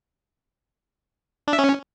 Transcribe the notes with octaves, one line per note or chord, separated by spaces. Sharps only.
D4
E5
C#4